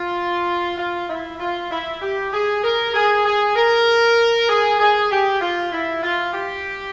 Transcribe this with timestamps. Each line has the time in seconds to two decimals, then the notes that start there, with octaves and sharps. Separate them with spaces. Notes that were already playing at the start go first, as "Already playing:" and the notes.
Already playing: F4
0.78 F4
1.09 E4
1.40 F4
1.71 E4
2.02 G4
2.33 G#4
2.64 A#4
2.94 G#4
3.25 G#4
3.56 A#4
4.49 G#4
4.79 G#4
5.10 G4
5.41 F4
5.72 E4
6.03 F4
6.34 G4